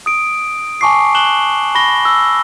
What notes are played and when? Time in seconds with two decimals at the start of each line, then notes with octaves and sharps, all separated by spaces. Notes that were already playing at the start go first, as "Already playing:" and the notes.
0.06 D#6 D7
0.81 G#5 A5 C#6 D6 C7
1.15 F#6 E7 F#7 G7
1.75 B5 C#6 A#6 G7
2.05 E6